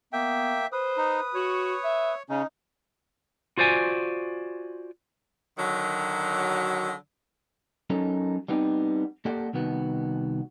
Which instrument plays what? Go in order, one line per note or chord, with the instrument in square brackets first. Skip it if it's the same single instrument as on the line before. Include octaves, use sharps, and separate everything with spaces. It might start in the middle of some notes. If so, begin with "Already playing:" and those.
[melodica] A#3 G5 [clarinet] B3 [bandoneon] E5
[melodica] B4 D#6 [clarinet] C5
[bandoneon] D#4
[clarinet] F#4 [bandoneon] C#5
[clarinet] E5
[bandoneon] C#3 [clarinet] C#4 [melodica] D#4
[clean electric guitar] F4 F#4 C5 D5 G#5
[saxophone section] D3 D#3 F#3
[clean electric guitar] F#3 C#4 D#4 A4 A#4
G3 B3 C4 D#4
A#3 G4 A4 D5 F#5
C2 D#3 B3 F#4